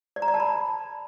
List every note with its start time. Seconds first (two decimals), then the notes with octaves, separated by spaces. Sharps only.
0.16 D5
0.22 A#5
0.28 D5
0.34 A5
0.40 B5